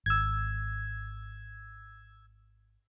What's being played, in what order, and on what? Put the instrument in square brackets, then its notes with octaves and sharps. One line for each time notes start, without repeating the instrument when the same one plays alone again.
[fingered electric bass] G#1 [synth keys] E6 G#6